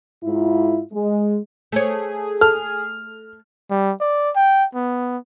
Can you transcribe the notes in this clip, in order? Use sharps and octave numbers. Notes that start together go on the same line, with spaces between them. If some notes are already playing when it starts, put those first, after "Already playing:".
G#2 E4 F4
G#3
A3 G#4 C#5
A4 F6
G3
D5
G5
B3